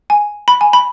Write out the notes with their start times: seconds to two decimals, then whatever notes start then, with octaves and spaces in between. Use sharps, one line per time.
0.10 G#5
0.48 B5
0.61 G#5
0.73 B5